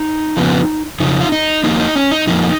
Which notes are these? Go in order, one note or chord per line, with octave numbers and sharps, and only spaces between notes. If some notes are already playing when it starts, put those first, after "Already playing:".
Already playing: D#4
F2 C#3 F3 B3
F2 C#3 D#4
F4
D#4
F2 F3 A#3 D#4
D#4
C#4
D#4
F2 F3 A#3 D#4